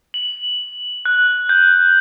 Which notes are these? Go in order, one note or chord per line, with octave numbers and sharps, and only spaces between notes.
F#7
F#6
G6